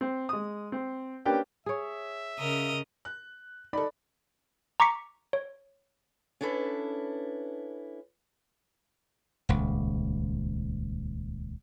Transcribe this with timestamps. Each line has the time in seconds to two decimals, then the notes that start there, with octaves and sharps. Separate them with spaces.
0.01 C4
0.29 G#3 D#6
0.72 C4
1.25 A#3 C#4 D4 G4 B4 G5
1.66 G#4 C#5 E5
2.39 C#3 A#4 D#5
3.05 F#6
3.73 D#4 A4 D5 B5
4.80 A#5 C#6 D6 B6 C#7
5.33 C#5
6.41 C#4 D4 E4 A4 B4
9.49 D#1 C#2